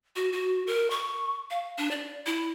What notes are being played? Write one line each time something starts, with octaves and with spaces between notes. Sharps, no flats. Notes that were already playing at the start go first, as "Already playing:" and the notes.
F#4
F#4
A#4
C#6
F5
D4
D5
E4